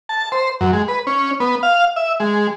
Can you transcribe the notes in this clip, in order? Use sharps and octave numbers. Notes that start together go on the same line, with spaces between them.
A5
C5
F#2
G#3
B4
C#4
B3
F5
E5
G#3